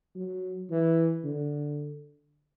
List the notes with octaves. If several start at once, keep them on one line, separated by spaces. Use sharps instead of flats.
F#3
E3
D3